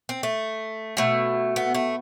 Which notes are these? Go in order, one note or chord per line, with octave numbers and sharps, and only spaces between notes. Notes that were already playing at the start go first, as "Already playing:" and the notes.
C4
A3
B2 A3
B3
A3